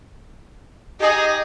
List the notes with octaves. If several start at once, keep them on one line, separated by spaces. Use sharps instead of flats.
D#4 G4 G#4 D#5